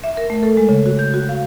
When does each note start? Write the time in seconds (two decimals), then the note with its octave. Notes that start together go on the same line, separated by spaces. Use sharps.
0.04 E5
0.17 A#4
0.30 A3
0.43 A4
0.57 G#3
0.69 C#3
0.86 F#4
0.99 G6
1.14 F#4
1.29 F5